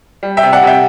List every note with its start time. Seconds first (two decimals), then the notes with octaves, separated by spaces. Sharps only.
0.23 G3
0.37 E5 G5
0.43 C3
0.52 D5 F#5
0.63 C3 E5 G5